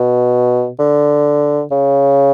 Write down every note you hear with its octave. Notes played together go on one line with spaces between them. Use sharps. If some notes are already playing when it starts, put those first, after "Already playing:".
Already playing: B2
D3
C#3